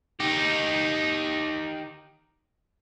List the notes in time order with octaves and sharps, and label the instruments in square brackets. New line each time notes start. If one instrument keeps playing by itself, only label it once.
[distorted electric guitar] D#4 G4